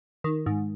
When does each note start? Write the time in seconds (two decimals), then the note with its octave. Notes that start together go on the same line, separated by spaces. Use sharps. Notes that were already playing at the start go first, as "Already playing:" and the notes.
0.24 D#3
0.46 G#2